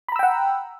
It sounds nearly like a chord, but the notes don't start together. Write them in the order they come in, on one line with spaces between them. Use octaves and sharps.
B5 A#5 E6 G5 F#5